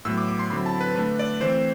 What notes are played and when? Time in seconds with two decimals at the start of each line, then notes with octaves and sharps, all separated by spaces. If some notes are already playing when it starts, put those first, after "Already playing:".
0.05 A2 F#3 B3 E6
0.18 D6
0.28 D6
0.39 C6
0.50 D3 F#3 C4 E4 B5
0.66 A5
0.81 B4
0.96 D3 A3 D4 B4
1.19 D5
1.41 E3 A3 C4 C5